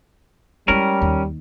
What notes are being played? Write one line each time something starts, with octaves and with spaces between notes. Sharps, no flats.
G3 G#3 C#4 E4 A#4
D#2